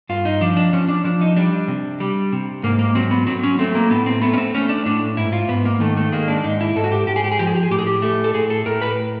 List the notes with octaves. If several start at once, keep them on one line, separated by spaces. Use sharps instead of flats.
G2 F4
D#4
F3 D4
D4
F3 C#4
D4
F3 D4
D#4
G3 D4
C3
G3
C3
G#2 A#3
A#3
F#3 C4
B3
F#3 C4
C#4
A3 C4
A#3
A2 B3
C4
A3 B3
C#4
C4
A3 C#4
D4
A2 D4
G#2 E4
F4
G#2 B3
A#3
D#3 A3
A3
G#3 A#3
D4
G#2 D#4
E4
G#2 A4
F#4
G4
G#2 G4
G#4
G4
G#4
F3 G4
G#4
G4
G#4
A2 G4
G#4
G4
A3
A4
A2 G#4
A4
A2 A#4
B4